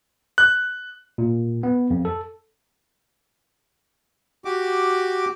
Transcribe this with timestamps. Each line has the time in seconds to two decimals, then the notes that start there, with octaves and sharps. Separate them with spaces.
0.38 F#6
1.18 A#2
1.63 B3
1.90 F2
2.05 A4
4.45 F#4 G4 D6